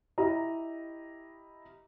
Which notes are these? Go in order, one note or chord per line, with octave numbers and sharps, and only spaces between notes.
E4 G4 D#5 A#5